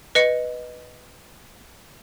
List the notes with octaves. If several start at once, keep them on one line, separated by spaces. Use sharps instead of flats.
B4 D#5 C#7